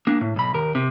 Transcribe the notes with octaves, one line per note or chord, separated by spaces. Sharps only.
A#3 D4
A2
B1 B5
D#2 A#4
C3